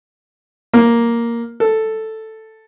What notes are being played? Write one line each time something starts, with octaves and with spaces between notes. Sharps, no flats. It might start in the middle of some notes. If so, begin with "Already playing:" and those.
A#3
A4